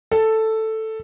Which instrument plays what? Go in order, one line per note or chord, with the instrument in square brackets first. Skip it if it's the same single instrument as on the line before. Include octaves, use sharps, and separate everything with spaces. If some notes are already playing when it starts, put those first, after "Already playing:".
[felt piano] A4